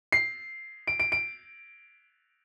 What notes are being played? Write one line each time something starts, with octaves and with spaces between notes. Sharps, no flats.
C7
D7
D7
D7